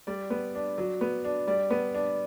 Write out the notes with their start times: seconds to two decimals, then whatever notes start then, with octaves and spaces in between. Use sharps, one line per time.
0.07 G3 D5
0.30 B3
0.55 D4
0.78 F#3
1.01 B3
1.25 D4
1.47 G3 D5
1.70 B3
1.94 D4